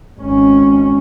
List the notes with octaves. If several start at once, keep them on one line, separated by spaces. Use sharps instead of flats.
G#1 C#4